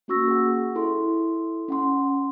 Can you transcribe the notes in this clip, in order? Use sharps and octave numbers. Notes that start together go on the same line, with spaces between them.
A#3 C#4 F#4 C#6 E6 A#6
G#4 F#5
E4 A4 C6
C#4 F#5 C6